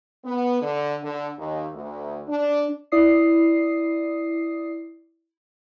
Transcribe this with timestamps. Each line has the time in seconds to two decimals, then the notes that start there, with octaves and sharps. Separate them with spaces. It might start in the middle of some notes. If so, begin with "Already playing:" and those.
0.25 B3
0.61 D3
1.03 D3
1.37 D#2
1.74 D2
2.27 D4
2.92 E4 D5 D#6 C7